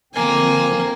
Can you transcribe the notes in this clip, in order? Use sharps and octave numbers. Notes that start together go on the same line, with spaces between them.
D3 F3 A#3 C4 G#5